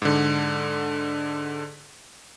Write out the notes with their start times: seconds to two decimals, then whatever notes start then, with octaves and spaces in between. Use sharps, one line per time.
0.02 G#2 D3